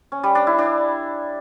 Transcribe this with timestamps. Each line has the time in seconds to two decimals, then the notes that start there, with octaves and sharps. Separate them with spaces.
0.12 C#4
0.23 G3
0.35 D4
0.47 E4
0.58 D4